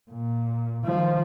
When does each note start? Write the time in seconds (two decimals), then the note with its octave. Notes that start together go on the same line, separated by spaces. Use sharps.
0.11 A#2
0.85 D#3 F3